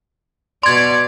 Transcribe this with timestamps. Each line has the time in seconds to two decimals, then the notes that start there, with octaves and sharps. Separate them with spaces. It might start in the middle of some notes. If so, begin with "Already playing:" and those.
0.63 B2 D5 C6 G#6